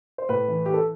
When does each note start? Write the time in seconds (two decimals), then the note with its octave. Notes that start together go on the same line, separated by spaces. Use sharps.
0.18 C5
0.29 A2 B4
0.48 E3
0.66 E3 G4
0.74 A4